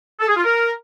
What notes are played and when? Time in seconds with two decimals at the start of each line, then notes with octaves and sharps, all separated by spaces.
0.20 A4
0.28 G#4
0.36 F4
0.44 A#4